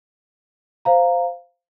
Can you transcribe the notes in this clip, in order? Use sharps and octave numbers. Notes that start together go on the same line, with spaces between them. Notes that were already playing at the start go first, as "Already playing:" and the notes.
C5 F5 A#5